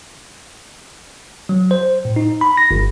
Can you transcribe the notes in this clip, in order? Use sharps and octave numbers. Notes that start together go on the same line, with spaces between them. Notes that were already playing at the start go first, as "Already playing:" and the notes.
F#3
C5
A2
D#4
B5
A#6
G1